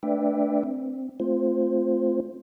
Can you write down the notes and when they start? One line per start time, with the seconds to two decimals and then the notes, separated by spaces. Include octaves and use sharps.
0.03 A3 D4 B4 D5 E5 G5
0.63 C4
1.20 A3 C4 F4 C5